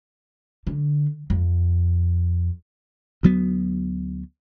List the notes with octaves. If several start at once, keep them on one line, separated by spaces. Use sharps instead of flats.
D3
F2
D2 F#3 B3